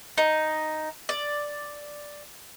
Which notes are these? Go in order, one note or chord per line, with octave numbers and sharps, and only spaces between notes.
D#4
D5